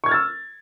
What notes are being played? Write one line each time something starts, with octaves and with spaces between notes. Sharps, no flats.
C#6 E6 F6 G#6 A6